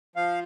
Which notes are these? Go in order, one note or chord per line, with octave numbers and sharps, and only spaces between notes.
F3 F5